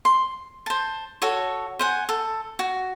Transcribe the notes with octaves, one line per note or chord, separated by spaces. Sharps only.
C6
C5 A5
F#4 A4 C#5
C5 F#5 G#5
A4
F#4